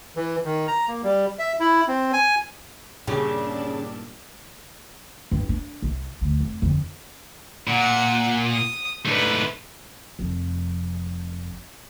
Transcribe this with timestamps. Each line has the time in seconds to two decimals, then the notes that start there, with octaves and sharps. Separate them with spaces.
0.16 E3
0.44 D#3
0.68 A#5
0.88 A#3
1.04 G3
1.39 E5
1.60 E4
1.88 C4
2.13 G#5
3.07 G2 A#2 C#3 D4 G4
5.32 G2
5.49 D4
5.82 C2
6.21 D2
6.40 F1
6.62 F2 D3
7.67 A#2 F#5
8.50 D#6
9.05 G#2 A3 D4 B4
10.19 F1 F2